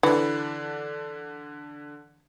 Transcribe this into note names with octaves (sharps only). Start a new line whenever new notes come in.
D3 E3 D4